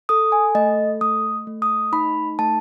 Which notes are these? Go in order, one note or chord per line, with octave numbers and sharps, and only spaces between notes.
A4 D#6
G#5
A3 D#5
A3 D#6
A3
D#6
D#4 B5
A3 A5